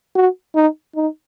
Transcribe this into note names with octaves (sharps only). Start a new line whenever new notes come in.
F#4
D#4
D#4